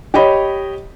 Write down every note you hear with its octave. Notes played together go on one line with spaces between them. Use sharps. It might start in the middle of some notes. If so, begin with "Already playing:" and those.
G4 C#5 D#5 B5